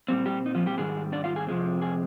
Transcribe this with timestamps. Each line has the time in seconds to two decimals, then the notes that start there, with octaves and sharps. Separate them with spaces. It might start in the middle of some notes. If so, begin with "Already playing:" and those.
0.08 A#2 G3 C4
0.26 G3 G4
0.46 D#4
0.55 F3 F4
0.66 G3 G4
0.78 G#2 D#3 G3 G#3 G#4
1.12 D4 D5
1.24 F4 F5
1.36 G#4 G#5
1.47 F2 C3 F3 G#3 C4
1.82 G#4 G#5